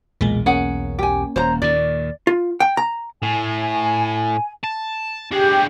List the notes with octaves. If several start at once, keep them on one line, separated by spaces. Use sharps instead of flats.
B1 E2 A#2 G#3
A#3 C#4 G#4 F#5
G4 G#5
D#1 C5 C#5 A#5
D#2 A#2 D#3 D5
F4
G5
A#5
A2 G#5
A5
D4 G4 G#4